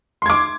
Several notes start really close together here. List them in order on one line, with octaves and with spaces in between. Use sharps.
C6 G#6 D6